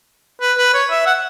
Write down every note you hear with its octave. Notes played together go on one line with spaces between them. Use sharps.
B4
B4
C#5
E5
F#5